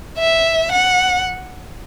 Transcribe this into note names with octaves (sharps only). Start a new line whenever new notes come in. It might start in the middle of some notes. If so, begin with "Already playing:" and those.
E5
F#5